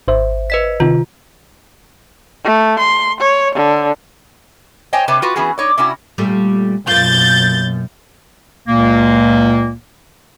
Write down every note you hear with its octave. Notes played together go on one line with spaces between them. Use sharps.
G#1 C5 E5
B4 D#5 B6
C3 D#3 F4
A3
C6
C#5
D3
C5 C#5 D#5 G5 G#5
C3 B4 C#5 A5
F4 F#4 B4
E3 B3 C#4 F#4 G#4
D#4 C#5 D5
C3 C#4 E4 F#4
A#2 G3 A3
F#2 B2 A#3 F4 G6 A6
C#2 A#2 A#3